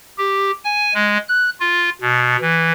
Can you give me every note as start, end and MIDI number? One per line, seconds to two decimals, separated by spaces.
0.18 0.51 67
0.64 0.94 80
0.94 1.17 56
1.29 1.50 90
1.60 1.90 65
2.02 2.37 47
2.41 2.72 52